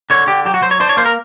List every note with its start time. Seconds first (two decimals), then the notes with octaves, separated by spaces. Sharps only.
0.10 D3 C#5
0.27 D3 G4
0.45 F#3 G4
0.54 F#4
0.62 F#3 C5
0.71 C#5
0.80 D4 C5
0.89 C#5
0.97 A#3 C5
1.06 A#4